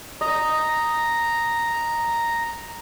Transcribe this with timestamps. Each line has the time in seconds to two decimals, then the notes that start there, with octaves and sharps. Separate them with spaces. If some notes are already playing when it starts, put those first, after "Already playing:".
0.21 D#5 A#5